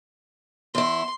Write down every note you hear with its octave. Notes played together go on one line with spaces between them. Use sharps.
E2 E4 C6